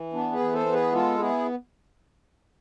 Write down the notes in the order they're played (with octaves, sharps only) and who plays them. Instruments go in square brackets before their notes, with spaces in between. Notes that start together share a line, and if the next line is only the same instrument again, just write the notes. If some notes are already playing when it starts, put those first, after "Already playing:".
Already playing: [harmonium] E3
B3 D4
G#4 B4
E3
A4 C5
B3
G#4 B4
G#3 F4 A4
B3 E4 G#4